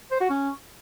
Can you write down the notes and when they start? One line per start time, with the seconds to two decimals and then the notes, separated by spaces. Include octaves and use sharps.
0.11 C5
0.21 F#4
0.30 C#4